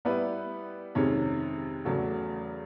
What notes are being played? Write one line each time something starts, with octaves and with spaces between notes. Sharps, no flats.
G3 B3 E4 G4 B4
F2 C3 D#3 G#3 C#4
E2 C#3 F#3 A3